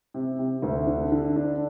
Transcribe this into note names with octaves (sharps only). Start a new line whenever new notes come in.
C3
C3
D2
D3
D3
D4